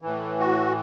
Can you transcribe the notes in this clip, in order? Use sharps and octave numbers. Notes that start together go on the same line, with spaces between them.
A2 E3
F#4